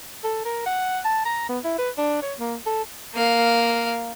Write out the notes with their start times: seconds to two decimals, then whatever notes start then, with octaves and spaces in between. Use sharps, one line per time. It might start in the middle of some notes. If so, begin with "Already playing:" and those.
0.24 A4
0.45 A#4
0.66 F#5
1.05 A5
1.25 A#5
1.49 B3
1.64 E4
1.78 B4
1.98 D4
2.22 C#5
2.39 A#3
2.66 A4
3.14 A#3 F5